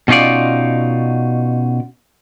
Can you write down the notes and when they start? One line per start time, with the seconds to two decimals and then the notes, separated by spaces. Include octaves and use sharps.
0.08 B2 C#4 D#4 F4 D5